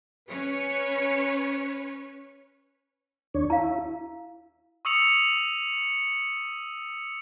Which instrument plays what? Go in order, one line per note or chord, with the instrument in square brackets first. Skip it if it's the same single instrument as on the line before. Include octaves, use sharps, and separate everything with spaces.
[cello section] C#4 B4 C#5
[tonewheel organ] D#2 D4 C#5
[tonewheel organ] E4 [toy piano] F5 A#5
[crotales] C#6 D#6 E6 C#7 F7